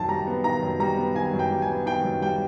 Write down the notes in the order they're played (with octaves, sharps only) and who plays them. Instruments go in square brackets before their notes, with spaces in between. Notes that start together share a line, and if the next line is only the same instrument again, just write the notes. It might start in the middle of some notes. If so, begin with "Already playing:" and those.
Already playing: [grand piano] F#2 D#3 A5
G3 A#5
B3
D#3 A#5
F#2
G3 A#5
B3
D#3 G#5
F#2
G5
G3
G#5
B3
D#3 G5
F#2
G3 G5